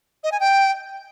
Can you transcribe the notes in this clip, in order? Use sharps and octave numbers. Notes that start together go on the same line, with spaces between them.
D#5
G#5
G5